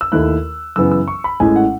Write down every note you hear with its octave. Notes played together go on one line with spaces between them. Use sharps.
E6
D#2 D#3 A3 E4 F#6
F#2 C#3 E3 B3 E6
E6
C#6
B5
A1 A2 G#3 C#4 G#5
F#5